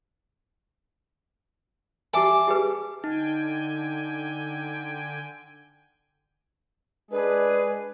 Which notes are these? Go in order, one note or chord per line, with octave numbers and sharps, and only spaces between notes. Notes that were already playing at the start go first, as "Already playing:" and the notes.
G4 A4 E5 G#5 D6
G4 G#4 B4
D3 D#4 G5 G#5
G#3 D4 G#4 B4